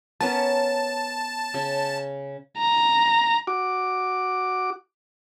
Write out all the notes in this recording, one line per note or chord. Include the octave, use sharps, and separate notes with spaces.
B3 C#4 A#4 A5
C#3
A#5
F#4 D6